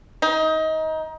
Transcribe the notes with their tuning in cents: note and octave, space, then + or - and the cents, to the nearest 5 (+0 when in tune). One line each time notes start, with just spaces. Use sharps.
D#4 +25